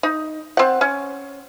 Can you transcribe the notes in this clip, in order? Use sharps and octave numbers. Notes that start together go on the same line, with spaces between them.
D#4
C4 F#5
C#4